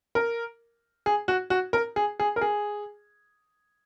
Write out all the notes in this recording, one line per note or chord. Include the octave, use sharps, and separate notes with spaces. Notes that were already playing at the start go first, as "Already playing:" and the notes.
A#4
G#4
F#4
F#4
A#4
G#4
G#4
A#4
G#4